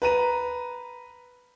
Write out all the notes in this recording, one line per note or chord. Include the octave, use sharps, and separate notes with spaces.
B4 A#5 D#7